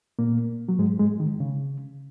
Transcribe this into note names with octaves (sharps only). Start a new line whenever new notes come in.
A#2 A#3
F#3
G#2 G#3
G#2 G#3
D#3
C#3